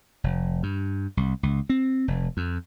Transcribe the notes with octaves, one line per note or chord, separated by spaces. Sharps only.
F1
G2
C2
C#2
C4
F1
F2